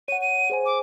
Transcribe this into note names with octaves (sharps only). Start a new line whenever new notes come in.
C#5 F#5 D#7
D#7
G#4 C5 G#5
D6